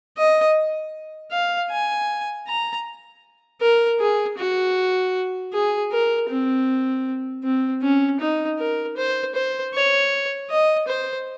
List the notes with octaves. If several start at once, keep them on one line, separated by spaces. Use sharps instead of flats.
D#5
F5
G#5
A#5
A#4
G#4
F#4
G#4
A#4
C4
C4
C#4
D#4
A#4
C5
C5
C#5
D#5
C5